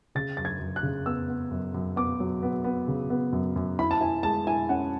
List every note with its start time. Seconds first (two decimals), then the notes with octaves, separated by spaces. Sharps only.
0.15 C#3 A6
0.37 F#2 A6
0.45 G#6
0.60 F#2
0.76 F#6
0.83 C#3
1.06 B3 E6
1.28 B3
1.51 F#2
1.74 F#2
1.96 B3 D6
2.20 F#3
2.43 B3
2.64 B3
2.88 C#3
3.10 B3
3.33 F#2
3.56 F#2
3.79 E4 B5
3.91 A5
4.01 E4 G#5
4.23 G#3 A5
4.47 E4 G#5
4.69 C#4 F#5